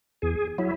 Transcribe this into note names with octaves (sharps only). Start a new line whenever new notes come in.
E2 G#4
F#3 E4